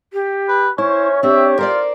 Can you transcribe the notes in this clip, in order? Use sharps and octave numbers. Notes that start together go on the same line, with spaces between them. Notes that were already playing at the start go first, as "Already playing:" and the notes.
G4
B4
C#4 E4 C5 C#5
C4 D4 G4 E5
F4 A#4 C5 D5